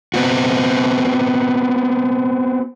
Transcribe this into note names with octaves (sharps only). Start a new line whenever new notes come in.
B3 C4 F#4